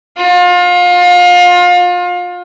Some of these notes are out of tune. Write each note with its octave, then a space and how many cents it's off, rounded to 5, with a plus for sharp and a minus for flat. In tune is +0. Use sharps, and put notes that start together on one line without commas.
F4 +30